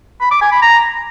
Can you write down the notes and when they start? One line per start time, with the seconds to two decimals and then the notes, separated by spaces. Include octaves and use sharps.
0.21 B5
0.31 D6
0.41 G#5
0.52 B5
0.62 A#5